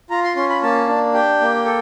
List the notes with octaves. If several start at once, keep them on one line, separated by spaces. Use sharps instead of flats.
F4 A#5
C6
C#4 C6
B5
A#3 A5
D4
G4 G5
A#3
A4